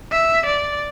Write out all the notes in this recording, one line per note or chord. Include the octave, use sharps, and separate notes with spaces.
E5
D5